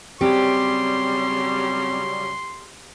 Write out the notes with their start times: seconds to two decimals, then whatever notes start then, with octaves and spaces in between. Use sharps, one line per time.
0.21 C#3 F#3 G3 C4 G4 C6